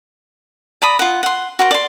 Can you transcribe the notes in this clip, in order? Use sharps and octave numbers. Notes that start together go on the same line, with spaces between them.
D5 A#5 B5 D#6
F4 F#5
F#5 C6
F#4 A#4 C5
D5 C6